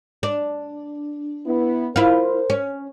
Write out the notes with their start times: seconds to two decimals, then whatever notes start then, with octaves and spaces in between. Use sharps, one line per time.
0.23 D4
1.46 B3 E4
1.96 E4 F4 A#4 C5
2.50 C#4